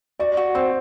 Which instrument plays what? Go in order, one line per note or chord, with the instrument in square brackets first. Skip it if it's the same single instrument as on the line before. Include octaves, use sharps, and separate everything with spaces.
[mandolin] F#4 [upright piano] D5
[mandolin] F#4
[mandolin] C4 [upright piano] C5